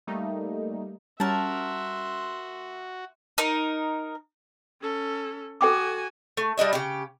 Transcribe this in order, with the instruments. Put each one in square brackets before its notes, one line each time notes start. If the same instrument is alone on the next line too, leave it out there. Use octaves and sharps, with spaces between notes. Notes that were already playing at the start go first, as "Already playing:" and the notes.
[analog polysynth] G3 A3 A#3 D#4
[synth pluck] G3 C#4 [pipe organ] F#4 [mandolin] A#4 A5 [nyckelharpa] E5 C6
[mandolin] D#4 A#4
[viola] C#4 A4
[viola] F#4 G#5 [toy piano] A4 G5 D6
[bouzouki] A3
G3 D4 D#5 E5
C#3 G4